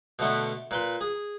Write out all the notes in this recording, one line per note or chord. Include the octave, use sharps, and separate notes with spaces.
B2 D3 A3 B3
A#2 B4 C6
G#4